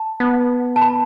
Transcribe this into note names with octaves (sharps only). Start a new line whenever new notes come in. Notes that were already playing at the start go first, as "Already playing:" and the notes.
Already playing: A5
B3
A5
B5